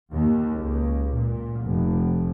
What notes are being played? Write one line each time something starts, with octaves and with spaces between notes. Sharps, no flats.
D#2
C#2
A#2
F1